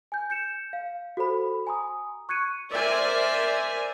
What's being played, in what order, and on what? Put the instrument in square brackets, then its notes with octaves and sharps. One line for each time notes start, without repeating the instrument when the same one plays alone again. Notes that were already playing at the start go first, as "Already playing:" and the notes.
[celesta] G#5 G6
G6 C#7 E7
F5
F#4 A4 C5 B5
G#5 A#5 C6 D#6
C#6 F#6 G#6 C#7 D#7
[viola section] A#4 C5 D5 E5 G#5